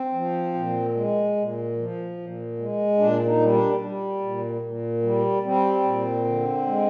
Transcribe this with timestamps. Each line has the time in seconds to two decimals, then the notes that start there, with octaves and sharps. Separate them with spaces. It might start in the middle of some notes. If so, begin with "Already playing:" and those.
Already playing: C4
0.13 F3
0.54 A#2
0.94 G#3
1.36 A#2
1.76 F3
2.17 A#2
2.58 G#3
2.98 A#2 D4
3.25 D#4
3.39 G3
3.53 D4
3.80 G3
4.20 A#2
4.61 A#2
5.02 G3
5.43 G3 C4
5.83 A#2
6.25 D3
6.66 G#3